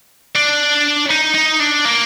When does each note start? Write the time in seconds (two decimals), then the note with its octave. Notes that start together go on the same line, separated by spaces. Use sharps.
0.35 D4
1.10 D#4
1.34 D#4
1.60 D4
1.85 A#3